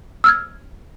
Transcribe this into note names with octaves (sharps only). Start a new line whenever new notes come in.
E6 F6 G#6